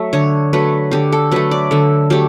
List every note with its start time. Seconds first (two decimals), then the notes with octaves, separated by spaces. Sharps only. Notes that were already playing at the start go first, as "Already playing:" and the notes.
Already playing: F#3 A3 E5
0.13 D3 C#5
0.53 F#3 A3 B4
0.91 D3 G4
1.12 A4
1.31 F#3 A3 B4
1.51 D5
1.71 D3 A4
2.10 F#3 A3 G4